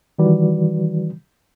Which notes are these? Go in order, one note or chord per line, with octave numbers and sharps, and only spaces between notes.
D#3 E3 G3 F#4 B4 D5